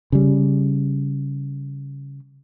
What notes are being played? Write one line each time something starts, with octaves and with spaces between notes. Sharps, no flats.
C#3 G3